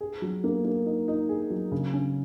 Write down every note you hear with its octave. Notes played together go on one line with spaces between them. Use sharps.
G#4
F#3
A#3
A#3
D#4
D#4
G#4
F#3
C#3
C#4